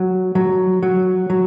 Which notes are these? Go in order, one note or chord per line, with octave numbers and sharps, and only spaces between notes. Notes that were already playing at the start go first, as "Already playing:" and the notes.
Already playing: F#3
F#3
F#3
F#3